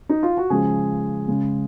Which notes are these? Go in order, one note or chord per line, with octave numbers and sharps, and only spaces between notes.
D#4
F4
F#4
C#3 F3 G#3 G#4
C#3 G#3